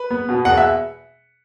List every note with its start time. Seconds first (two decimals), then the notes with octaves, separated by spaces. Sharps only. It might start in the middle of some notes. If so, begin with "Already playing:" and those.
Already playing: B4
0.11 B3
0.29 B2
0.45 E2 F#5
0.57 E5